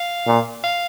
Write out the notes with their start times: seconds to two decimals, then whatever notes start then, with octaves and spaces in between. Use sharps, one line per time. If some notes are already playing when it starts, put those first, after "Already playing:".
Already playing: F5
0.27 A#2
0.64 F5